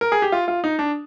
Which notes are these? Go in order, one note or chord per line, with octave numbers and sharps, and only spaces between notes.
A#4
G#4
G4
F4
F4
D#4
D4